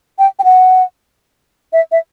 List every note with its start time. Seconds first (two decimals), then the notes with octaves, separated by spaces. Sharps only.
0.19 G5
0.39 G5
0.44 F#5
1.73 E5
1.92 E5